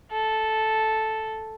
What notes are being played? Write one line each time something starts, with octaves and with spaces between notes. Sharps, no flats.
A4